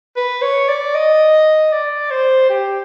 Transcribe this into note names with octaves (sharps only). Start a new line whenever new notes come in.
B4
C#5
D5
D#5
D5
C5
G4